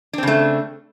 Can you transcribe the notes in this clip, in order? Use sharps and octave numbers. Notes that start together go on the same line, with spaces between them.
C#3 A3 C4 D4